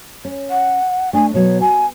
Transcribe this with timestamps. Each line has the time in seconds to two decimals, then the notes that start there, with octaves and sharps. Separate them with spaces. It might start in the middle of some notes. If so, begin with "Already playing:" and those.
0.25 C#4
0.50 F#5
1.13 A3 D4 G#5
1.34 B2 F#3 B3 C#5
1.61 F#4 G#5